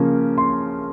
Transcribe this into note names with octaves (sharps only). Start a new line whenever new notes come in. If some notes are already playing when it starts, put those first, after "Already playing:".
Already playing: C#3 F3 A#3 C#4
C6